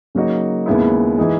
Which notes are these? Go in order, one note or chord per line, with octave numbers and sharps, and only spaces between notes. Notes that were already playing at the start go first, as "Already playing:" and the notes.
C#3 F#3 A#3 D#4 F#4
D#2 C#3 G#3 B3 E4
E3 G#3 D#4 G#4